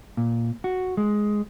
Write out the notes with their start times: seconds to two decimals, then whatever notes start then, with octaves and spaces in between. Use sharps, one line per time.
0.17 A#2
0.64 F#4
0.97 G#3